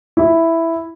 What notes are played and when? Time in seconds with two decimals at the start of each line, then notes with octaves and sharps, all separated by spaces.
0.17 E4